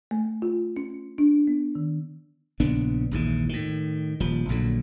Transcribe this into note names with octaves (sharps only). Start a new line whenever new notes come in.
A3
F4
C#4
D4
B3
D#3
A#1 C#3 B3 D4
A#1 D#2 G#2 E3
A2 D#3
D#1 F3
A#1 A#2 D3 F#3